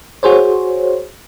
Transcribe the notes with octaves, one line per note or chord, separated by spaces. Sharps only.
F#4 G#4 C5 C#5